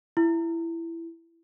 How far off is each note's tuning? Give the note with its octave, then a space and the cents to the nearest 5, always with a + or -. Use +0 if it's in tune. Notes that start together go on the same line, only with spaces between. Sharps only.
E4 +15